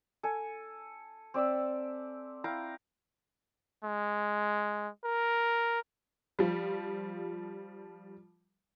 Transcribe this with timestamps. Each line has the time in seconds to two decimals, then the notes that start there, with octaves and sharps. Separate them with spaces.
0.23 A4 G#5
1.34 C4 D5 E5 E6
2.44 E4 F5 G5 A#5
3.84 G#3
5.04 A#4
6.39 F3 G3